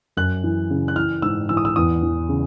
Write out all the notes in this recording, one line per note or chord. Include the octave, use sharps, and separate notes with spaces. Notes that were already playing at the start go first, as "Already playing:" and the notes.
F#2 F#6
E3
C#3
F#6
E3 F6
G#2 E6
E3 E6
D#6
E6
E2 D#6
E3
C#3